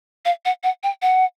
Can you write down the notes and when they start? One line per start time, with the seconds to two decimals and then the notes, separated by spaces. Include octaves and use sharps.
0.25 F5
0.45 F#5
0.63 F#5
0.83 G5
1.02 F#5